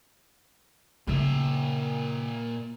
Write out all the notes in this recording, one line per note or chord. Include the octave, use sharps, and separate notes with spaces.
A#2 C#3 D#4 E5